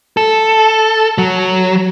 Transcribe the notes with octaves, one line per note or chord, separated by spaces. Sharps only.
A4
F#3